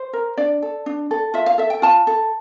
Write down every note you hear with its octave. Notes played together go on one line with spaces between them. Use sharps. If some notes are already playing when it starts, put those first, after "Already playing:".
Already playing: C5
A#4
D4 D5
A4
D4
A4
F4 E5
F5
A4 E5
G5
F4 A5
A4